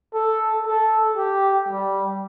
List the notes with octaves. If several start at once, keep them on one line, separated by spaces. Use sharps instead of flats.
A4
A4
G4
G3